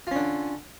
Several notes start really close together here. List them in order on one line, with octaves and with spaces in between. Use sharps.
F4 C#4 D3